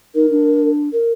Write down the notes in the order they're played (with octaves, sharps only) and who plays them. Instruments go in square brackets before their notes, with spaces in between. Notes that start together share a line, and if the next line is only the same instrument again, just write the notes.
[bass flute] D#4 [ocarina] A#4
[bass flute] D4
[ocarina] A#4